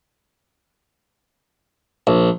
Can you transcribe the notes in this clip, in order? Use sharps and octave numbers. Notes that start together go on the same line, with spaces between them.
A#1